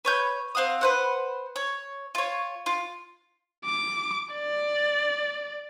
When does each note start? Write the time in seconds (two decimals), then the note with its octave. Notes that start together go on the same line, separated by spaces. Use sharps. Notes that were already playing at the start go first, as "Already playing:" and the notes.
0.05 B4 C#5 G6
0.55 C4 F5 F#5 D#6
0.81 B4 C5 F#5
1.56 C#5
2.15 F4 C#5
2.66 F4
3.64 D6
4.34 D5